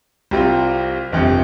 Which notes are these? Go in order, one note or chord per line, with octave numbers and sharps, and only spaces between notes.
C2 C3 G3 C4 F4
G1 F2 C3